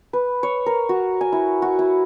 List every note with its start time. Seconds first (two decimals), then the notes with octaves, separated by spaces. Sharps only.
0.13 B4
0.43 C#5
0.66 A#4
0.89 F#4
1.21 G#5
1.32 E4
1.62 F#4
1.79 E4